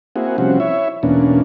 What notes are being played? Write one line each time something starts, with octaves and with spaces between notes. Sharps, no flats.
A#3 C4 E4 F#4 G#4
C3 F3 G3 C4 C#4 F#4
E4 C#5 E5
E2 B2 A#3 C#4 D4